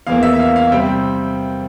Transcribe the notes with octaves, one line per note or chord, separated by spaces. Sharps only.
E2 E3 A#3 F5
E5
F5
F5
C3 G3 C4 G5